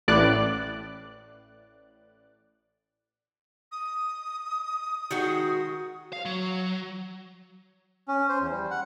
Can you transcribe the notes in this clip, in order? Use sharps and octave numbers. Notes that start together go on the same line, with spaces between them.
A1 A2 D5 F#6
D#6
D#3 G#3 F#4
F5
F#3
C#4
C5
E2
G3
F#5